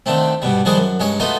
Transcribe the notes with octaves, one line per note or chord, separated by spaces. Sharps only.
D3 D#3 A3 C4
G2 B2 G3
D#3 F3 G3 F#4 G#4 A#4
F#2
G2 G#3 C#4 C#5
A3 B3 D#4 F4 F#4 D#5